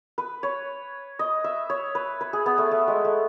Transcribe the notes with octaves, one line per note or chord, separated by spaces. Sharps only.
B4
C#5
D#5
E5
C#5
B4
B4
G#4
B3
A3
A3
G#3
A3